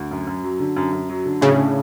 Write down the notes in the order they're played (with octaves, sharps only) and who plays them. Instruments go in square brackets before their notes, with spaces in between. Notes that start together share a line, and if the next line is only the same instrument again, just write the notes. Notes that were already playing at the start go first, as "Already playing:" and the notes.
Already playing: [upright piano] D2
F#2
F#2
F#3
D3
F#2
F#2
F#3
D3
[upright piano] A2 [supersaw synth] C#3
[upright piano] D4